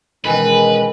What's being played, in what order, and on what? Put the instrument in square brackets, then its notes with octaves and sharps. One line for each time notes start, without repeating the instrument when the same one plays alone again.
[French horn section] B2 G#3 C#4 [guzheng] D#3 E3 [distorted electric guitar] B4 [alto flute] G#5